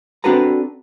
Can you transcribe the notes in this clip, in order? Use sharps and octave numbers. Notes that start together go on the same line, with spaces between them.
C4 D4 F#4 A4 B4 A#5